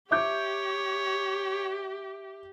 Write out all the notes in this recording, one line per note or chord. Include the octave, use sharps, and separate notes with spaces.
G4 C#5 E5 D6 G6